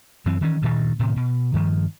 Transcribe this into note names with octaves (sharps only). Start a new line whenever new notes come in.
F#2 E3 C4
D#3 E3 A3 C#4
D2 G2 A#2 D#3
A2 C3 D#3
B2
G2 D#3 F3